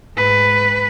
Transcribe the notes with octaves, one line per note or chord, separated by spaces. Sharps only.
G#2 B4